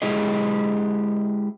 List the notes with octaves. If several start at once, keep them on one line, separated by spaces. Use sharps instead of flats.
G#3 E4 G4 G#4 D#5